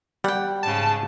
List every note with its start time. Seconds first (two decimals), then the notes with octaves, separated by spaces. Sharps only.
0.24 G3 F#5 G5
0.63 G#2 C#3 A5